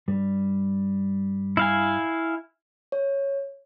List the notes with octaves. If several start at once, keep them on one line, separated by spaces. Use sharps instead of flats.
G2 G3
E4 F5 G#5
C#5